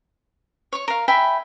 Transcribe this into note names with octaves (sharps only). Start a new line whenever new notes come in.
C#5 C#6
A#4 F5
E5 G5 G#5 B5